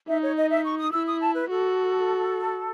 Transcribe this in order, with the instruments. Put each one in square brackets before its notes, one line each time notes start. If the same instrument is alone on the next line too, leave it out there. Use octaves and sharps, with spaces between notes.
[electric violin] D#4 [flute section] E5
[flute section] C#5
D#5
E5
C#6
D#6
[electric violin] E4 [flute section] E6
[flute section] D#6
A5
B4
[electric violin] F#4 [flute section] A4